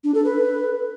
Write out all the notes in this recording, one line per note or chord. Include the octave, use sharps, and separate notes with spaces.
D4
A4
B4